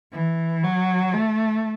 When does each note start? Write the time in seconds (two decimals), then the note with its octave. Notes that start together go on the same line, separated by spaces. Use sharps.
0.13 E3
0.64 F#3
1.13 A3